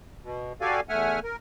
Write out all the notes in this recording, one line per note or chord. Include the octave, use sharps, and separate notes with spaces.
B2
F#4 G4 A4 D5 F5 G#5
E2 A3 E5 F#5 G#5 F6
A#4